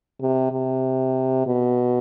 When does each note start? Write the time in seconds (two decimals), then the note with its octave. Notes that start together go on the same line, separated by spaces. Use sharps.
0.21 C3
0.52 C3
1.47 B2